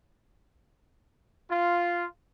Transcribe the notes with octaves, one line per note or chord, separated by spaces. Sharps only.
F4